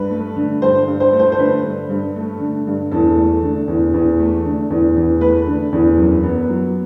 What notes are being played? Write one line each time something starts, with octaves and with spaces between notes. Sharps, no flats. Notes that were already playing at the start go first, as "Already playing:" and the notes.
Already playing: G2 B4
A3
D3
G2 C5
G2
C5
A3
C5
C5
D3 B4
G2
G2
A3
D3
G2
E2 A4
A3
D3
E2
E2
A3
D3
E2
E2
A3 B4
D3
E2
F#2
B3
F#3